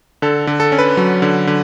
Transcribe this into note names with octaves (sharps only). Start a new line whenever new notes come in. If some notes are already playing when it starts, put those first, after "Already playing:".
D3 A4
D3
A4
C#4
B4
F#3
D3
D3